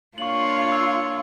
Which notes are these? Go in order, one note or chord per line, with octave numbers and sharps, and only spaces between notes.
A#3 D4 F4 C#5 C#6 F#7
E6